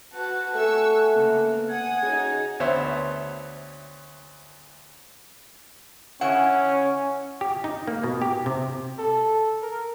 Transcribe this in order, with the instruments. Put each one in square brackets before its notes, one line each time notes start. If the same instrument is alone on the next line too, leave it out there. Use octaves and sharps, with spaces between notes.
[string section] F#4 B4 A5 [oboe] F#5
[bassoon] A3 [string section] G#5 C#6 E6
[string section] C#3 A#3 B3
[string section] F#5 D#6 [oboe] G#5
[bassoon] C#3 [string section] D#4 F#4
[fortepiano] D2 B3 C5 C#5 E5
[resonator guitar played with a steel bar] C#3 E4 F#5 [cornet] C#4
[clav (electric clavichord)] G4
D#4
A#3
B2
G4
C3
[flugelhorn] A4
A#4